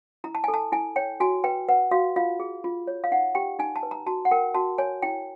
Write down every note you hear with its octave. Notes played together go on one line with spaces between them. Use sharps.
E4 A#5
A5
A4 G#5
A5
E4 G#5
C#5 G5
F#4 G#5
B4 G5
B4 F#5
F#4 F5
F4 F5
G#4
F4
C#5
F5
D#4 F#5
G4 G5
D#4 G#5
A5
B4
A#5
F#4 A5
F#5
A#4 G5
F#4 A5
C#5 G#5
E4 G5